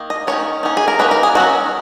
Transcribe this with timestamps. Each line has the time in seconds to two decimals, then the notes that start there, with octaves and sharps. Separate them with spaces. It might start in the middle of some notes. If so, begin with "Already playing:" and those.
Already playing: D#3 A#3
0.10 D#5
0.27 D#3 A#3 C#4 C#5
0.63 D#3 A#3 C#4
0.77 G#4
0.88 A#4
0.99 D#3 A#3 C#4 B4
1.11 A#4
1.23 G#4
1.35 D#3 F#3 C#4 F#4